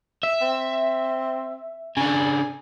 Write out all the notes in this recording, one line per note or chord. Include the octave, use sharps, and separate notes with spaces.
E5
C4
C#3 D4 G#5